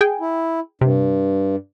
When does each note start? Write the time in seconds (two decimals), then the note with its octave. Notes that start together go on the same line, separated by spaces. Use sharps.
0.01 G#4 G5 G#5
0.20 E4
0.81 G2 C3